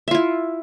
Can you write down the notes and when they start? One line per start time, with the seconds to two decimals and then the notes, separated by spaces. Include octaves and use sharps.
0.08 E5
0.11 F4
0.15 E4